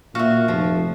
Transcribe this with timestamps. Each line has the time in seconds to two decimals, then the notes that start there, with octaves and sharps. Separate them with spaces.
0.15 A#2 F#4 E5 F5
0.48 F1 F3